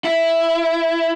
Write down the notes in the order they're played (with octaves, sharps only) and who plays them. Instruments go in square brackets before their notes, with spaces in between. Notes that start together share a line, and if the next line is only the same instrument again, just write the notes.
[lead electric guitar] E4